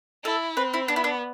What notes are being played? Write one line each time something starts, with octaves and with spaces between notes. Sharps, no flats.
E4 A4
C4 B4
E4
B3 D4
E4
D4